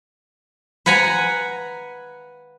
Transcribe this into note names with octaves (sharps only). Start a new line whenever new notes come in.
B4 F#5 G#5 A#5 B5